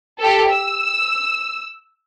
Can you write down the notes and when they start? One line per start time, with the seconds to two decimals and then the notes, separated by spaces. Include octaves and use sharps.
0.19 G4 A4
0.50 E6